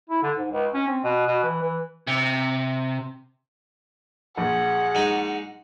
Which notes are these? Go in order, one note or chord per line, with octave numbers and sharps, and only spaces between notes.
E4
D3
G#2
C#2
C#4
C4
B2
B2
E3
E3
C3
A#1 G#4 F#5
G#3 D#4